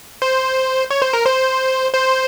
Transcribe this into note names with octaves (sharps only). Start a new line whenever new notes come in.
C5
C#5
C5
A#4
C5
C5